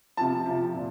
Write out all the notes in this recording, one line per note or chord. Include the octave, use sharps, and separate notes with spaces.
C3 F3 A5
C3 F3
A#2